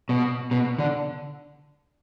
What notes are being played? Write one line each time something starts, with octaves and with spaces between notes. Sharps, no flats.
B2
B2
D3